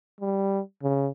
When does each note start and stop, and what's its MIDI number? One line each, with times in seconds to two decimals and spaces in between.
0.21 0.60 55
0.83 1.09 49